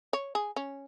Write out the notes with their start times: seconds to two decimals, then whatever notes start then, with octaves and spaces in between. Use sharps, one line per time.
0.13 C#5
0.35 G#4
0.56 C#4